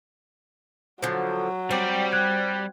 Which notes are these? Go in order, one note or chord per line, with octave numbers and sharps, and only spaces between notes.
D3 F3 F#3
G3 C4 D5
F#6 G#6